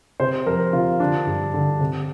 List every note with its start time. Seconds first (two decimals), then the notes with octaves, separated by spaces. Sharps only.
0.20 C3 C5
0.46 F2 A#4
0.73 C3 F4
1.00 D3 D4
1.26 G2
1.54 D3
1.80 C3